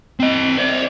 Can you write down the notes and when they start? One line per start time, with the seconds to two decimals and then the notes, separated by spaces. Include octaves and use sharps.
0.20 C4 D#5
0.57 C5 D5